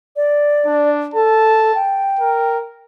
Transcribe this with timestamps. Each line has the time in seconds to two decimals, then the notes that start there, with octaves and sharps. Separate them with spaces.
0.16 D5
0.66 D4
1.14 A4 A5
1.75 G5
2.19 A#4